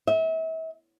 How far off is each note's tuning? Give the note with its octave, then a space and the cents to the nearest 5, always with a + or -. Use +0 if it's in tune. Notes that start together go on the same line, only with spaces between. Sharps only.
E5 -35